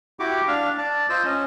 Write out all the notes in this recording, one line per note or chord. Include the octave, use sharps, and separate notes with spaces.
E4 F#4 G4 D6
D4 F5
D5 A5
F4 C5 D#5 E6
C#4 D#5